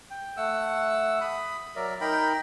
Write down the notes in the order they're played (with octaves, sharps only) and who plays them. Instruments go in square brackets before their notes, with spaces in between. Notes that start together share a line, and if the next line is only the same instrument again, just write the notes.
[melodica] G5
A3 F#5 E6
B5 D#6
F#3 A#4 D5 E5
D#4 A#4 G5 B5